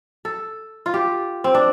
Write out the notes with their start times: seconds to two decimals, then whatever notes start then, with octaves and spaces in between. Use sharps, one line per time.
0.25 A4
0.86 F4
0.94 G4
1.44 C4
1.55 D4